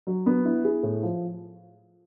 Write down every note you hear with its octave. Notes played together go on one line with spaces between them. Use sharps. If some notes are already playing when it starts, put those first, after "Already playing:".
F#3
B3
E4
G#4
A2
F3